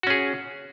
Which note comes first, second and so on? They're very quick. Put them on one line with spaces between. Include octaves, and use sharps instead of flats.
F#4 C#4 G#4